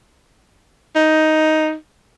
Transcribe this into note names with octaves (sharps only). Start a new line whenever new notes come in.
D#4